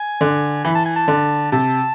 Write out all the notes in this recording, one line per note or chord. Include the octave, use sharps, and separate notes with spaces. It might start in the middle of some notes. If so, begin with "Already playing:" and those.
Already playing: G#5
D3
E3 B5
A5
G#5
A5
D3
C3 A5